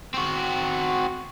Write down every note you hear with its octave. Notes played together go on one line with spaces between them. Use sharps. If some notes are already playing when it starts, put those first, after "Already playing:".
C4 F#4